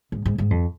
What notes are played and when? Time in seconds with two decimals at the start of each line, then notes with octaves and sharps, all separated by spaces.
0.12 G#2
0.26 G#2
0.38 G#2
0.51 F2